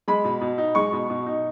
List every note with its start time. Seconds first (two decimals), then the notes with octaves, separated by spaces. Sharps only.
0.08 G#3 B5
0.24 B2
0.41 B2
0.58 D#4
0.75 G#3 C#6
0.93 B2
1.10 B2
1.26 D#4